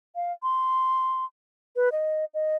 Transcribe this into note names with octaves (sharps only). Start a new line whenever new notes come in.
F5
C6
B4
D#5
D#5